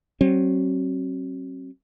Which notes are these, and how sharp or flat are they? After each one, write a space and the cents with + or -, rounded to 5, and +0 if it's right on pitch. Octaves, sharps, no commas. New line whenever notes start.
F#3 +35 C4 +40